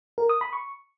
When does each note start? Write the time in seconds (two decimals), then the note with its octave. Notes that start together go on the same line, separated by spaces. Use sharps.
0.18 A#4
0.29 D#6
0.41 B5
0.53 C#6